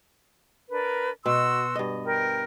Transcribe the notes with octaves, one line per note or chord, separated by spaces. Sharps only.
D4 A#4 B4
B2 F#4 C6 E6
G2 D#5
A#4 G5